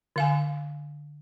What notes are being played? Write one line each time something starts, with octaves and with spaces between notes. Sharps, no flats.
D3 F5 G#5